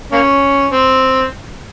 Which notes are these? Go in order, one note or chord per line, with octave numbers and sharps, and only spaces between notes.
A#3 C#4
C4